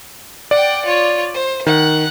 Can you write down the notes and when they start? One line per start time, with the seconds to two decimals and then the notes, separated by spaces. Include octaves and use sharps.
0.51 D5 F#5 G5
0.85 F4 C#5
1.34 C5
1.66 D#3 F#5 F#6